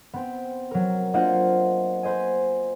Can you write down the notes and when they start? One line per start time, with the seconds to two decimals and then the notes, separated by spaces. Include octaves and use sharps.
0.13 B3 C4
0.71 F#3 A#4
1.14 A#3 D4 F4 C5 D#5 F#5
2.03 B4 C5 D#5 G#5